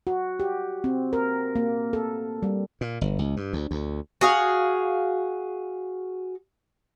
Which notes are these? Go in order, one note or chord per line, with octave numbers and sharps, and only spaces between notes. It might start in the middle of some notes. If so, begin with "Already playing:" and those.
F#4
G4
C4
A#4
A#3
A4
G3
A#2
G1
C#2
G2
D2
D2
F#4 G#4 F5